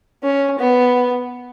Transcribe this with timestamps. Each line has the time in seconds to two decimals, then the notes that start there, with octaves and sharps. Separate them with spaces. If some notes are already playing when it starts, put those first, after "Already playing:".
0.23 C#4
0.59 B3